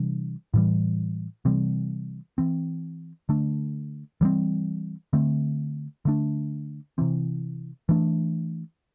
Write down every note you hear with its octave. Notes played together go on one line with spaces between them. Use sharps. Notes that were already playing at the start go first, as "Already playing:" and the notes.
Already playing: C3 E3 G3 D4
A2 E3 G3
C3 E3 G3 C4
E3 C4
D3 A3 D4
E3 G3 C4
D3 A3 C4
D3 A3 D4
C3 E3 C4
E3 A3 D4